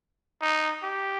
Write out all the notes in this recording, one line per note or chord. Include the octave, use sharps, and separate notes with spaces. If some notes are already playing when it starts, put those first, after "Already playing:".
D#4
G4